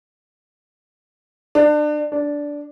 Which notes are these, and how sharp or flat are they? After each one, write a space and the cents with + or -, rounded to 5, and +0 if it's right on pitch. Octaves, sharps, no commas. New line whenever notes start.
D4 +30
D4 -10